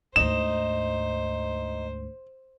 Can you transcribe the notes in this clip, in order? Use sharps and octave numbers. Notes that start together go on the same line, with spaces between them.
D2 G#2 D#4 C5 E7